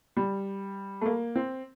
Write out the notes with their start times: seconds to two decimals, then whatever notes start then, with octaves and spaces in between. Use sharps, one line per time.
0.17 G3
1.01 A3
1.06 A#3
1.36 C4